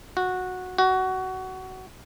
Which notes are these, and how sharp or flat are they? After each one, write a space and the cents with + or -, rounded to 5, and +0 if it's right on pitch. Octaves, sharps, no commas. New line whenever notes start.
F#4 -10
F#4 +20